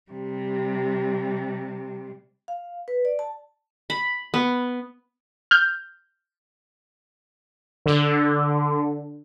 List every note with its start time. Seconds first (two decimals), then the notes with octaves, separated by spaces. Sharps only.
0.12 C3 G3
2.48 F5
2.88 B4
3.05 D5
3.19 A5
3.90 B5
4.34 B3
5.51 F6 G6
7.86 D3